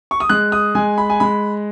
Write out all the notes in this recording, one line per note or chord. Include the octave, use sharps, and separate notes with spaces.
C#6
D#6
G#3 F#6
D#6
G#3 G#5
B5
G#5
G#3 B5